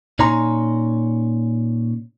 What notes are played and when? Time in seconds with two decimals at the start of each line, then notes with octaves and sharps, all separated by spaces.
0.19 A#2 C#4 D#4 G#5 A#5 C6